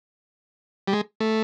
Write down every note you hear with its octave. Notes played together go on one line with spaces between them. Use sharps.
G3
G#3
A3